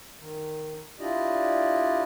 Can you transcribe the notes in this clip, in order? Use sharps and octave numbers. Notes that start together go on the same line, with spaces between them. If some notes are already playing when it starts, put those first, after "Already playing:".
D#3
D4 E4 F4 G4 D5 D#5